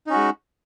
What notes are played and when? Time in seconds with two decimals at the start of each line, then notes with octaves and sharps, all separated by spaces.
0.07 D#4
0.10 C#4
0.13 F#4
0.16 G#3